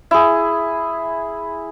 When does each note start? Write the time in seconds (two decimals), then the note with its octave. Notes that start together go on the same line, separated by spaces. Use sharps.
0.11 E4 G#4